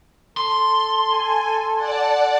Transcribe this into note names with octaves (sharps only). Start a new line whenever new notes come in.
A4 C6
G#5
D5 F#5 A5